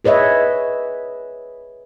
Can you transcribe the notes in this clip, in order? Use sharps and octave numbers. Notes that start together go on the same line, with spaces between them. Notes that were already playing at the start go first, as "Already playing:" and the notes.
G#4 B4 C#5 D#5 E5